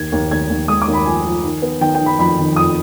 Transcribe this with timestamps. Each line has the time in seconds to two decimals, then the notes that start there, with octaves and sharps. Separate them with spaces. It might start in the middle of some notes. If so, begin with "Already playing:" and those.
Already playing: D#2 G#6
0.12 D#2
0.31 D#2 G#6
0.50 D#2
0.68 G#3 D#6
0.82 D6
0.88 D#2
0.94 B5
1.06 F3 G#5
1.25 F3
1.44 D#3
1.62 B3
1.81 D#3 G5
1.95 G5
2.01 D#3
2.06 B5
2.19 F2 B5
2.39 D#3
2.56 F2 D#6